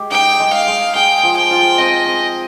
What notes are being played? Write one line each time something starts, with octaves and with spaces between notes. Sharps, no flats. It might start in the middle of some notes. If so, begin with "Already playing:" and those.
Already playing: G#3 G4
D#4 G5
G#3
F5
G#3
G#4 G5
F3
G5
F4
C4 D#5
G#4